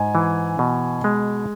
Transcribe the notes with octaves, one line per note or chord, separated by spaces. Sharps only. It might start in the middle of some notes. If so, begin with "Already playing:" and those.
Already playing: G#2 G#5
E3
B2
G#3